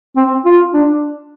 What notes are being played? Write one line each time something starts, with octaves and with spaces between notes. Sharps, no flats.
C4
F4
D4